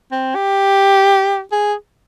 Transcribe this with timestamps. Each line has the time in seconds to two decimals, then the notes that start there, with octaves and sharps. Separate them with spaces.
0.12 C4
0.35 G4
1.52 G#4